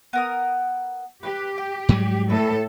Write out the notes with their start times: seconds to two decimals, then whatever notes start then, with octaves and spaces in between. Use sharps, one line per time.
0.13 B3 A#4 D#6
1.23 G4 B4
1.58 G5
1.89 G#2 F#3 G3
2.29 A2 A4 B4 D5